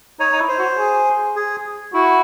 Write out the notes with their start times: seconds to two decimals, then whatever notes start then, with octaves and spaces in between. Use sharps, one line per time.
0.20 D#4 C#5
0.32 D#4
0.40 E4
0.49 C5
0.59 F#4
0.78 G#4
1.36 G#4
1.94 E4 F#4